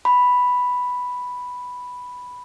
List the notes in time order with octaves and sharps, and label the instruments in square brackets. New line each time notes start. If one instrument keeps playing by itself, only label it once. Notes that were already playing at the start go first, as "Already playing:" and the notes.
[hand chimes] B5